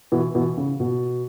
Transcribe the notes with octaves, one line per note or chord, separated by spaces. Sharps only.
B2 E3
B2 E3
C#3
B2